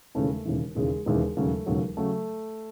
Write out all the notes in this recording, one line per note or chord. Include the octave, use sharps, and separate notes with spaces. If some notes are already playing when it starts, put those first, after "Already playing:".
E1 D#2 C#3 E3 A3
A3
E1 D#2 C#3 E3
E1 D#2 C#3 E3 G#3
E1 D#2 C#3 E3 G#3
E1 D#2 C#3 F#3 A3
E1 D#2 C#3 F#3
C#3 F#3 A3